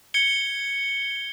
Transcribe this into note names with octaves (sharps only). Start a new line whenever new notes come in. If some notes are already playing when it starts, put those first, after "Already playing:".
G#6 C#7 G7